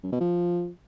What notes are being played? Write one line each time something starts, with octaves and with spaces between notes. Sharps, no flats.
F#2
B2
F3